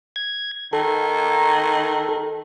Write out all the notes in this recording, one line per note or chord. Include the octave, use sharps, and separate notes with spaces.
G#6
D#3 A4